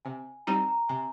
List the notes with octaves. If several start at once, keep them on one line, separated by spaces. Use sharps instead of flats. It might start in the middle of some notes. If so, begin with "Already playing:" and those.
C3 G#5
G3 C4 D#4 A#5
A#5
C3 G#5